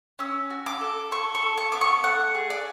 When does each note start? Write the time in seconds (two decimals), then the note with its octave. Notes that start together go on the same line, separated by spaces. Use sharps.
0.19 C#4 E6
0.50 F#4
0.66 D6
0.81 A4
1.11 A4 C#6
1.35 C#6
1.42 A4
1.58 C#6
1.72 B3 D6
1.81 C#6
2.04 A3 F#5
2.35 G#4
2.50 D5